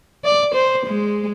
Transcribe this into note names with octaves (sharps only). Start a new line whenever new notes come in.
D5
C5
G#3